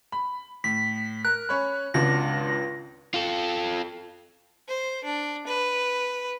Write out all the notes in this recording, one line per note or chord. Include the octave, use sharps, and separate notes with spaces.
B5
A2 B6
A#4 F#6
C#4 C#5 B5
G#1 C#2 D4 F#4 A#6
F4 A4
C5
D4
B4